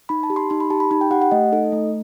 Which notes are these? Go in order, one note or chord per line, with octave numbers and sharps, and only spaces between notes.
D#4 B5
A5
G4
C6
D#4 C6
B5
G4 A5
B5
D#4 B5
G5
G4 F#5
F#5
A3 D#5
D#4 A4
A3